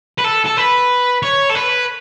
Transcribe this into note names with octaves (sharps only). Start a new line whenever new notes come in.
B4
A4
A4
B4
C#5
A4
B4